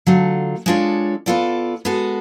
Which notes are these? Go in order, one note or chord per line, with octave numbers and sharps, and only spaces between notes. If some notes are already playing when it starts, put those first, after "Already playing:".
D3 F#3 A3 F4
G#3 D4 F4 A4 C#5
B3 F4 A4 D5
G#3 B3 F#4 A4